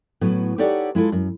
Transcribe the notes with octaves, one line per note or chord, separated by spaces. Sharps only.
A2 F#3 B3
D#4 G4 A4 C#5 D5 F#5
G#3 E4 F4 A4
F#2